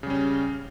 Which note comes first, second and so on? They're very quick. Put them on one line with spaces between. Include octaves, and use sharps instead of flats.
C#3 G3 C#4